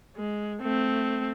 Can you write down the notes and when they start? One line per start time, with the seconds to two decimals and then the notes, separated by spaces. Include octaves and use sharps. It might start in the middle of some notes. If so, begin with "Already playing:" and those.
0.16 G#3
0.62 A3 C4